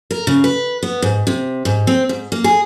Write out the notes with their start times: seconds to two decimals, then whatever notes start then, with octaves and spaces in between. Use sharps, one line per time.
0.11 A#4
0.27 C#3
0.44 B4
0.83 B3
1.02 G#2
1.27 C3
1.65 G#2
1.87 C4
2.09 G#2
2.32 A#3
2.44 G#4